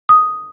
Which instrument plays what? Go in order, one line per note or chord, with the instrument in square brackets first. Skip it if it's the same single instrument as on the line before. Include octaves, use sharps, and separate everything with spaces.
[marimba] D#6